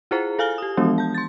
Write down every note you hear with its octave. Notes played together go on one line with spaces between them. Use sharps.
E4 F4 G#4 C5 A#5
A4 F5 G#5 F6 G7
G4 D#6
E3 F3 G#3 B3 D4
A5 G6
C6 A6